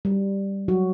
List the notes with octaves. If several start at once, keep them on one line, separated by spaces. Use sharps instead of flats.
G3
F#3 F#4